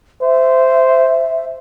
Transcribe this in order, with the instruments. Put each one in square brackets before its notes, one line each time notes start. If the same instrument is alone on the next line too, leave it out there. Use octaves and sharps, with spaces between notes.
[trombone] C5 [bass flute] E5